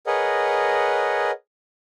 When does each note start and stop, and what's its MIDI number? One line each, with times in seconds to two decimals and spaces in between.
0.07 1.31 68
0.07 1.31 70
0.07 1.31 71
0.07 1.31 73
0.07 1.31 75
0.07 1.31 78